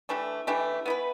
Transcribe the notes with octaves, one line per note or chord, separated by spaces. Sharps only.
E3 A3 D4 G4
E3 A3 D4 G4
B3 E4 B4